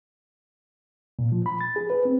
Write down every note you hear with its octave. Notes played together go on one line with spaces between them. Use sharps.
A#2
F3
B5
A6
G#4
B4
C4